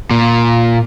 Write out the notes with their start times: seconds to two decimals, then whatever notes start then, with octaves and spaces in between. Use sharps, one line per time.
0.11 A#2